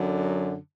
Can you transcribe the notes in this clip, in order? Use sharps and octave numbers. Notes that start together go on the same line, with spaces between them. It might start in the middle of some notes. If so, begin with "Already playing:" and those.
Already playing: F#2 D3 F#3